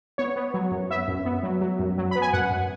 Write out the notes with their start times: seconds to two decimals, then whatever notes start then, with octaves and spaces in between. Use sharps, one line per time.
0.18 B3 C#5
0.36 B3
0.54 F#3
0.71 F#2
0.90 B3 E5
1.08 F#2
1.25 B3
1.43 F#3
1.61 F#3
1.79 F#2
1.98 F#3
2.11 B3 B5
2.22 G#5
2.33 F#2 F#5
2.51 F#2